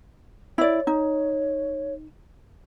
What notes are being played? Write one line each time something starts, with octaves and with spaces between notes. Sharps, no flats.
E4 C#5 D5
D#4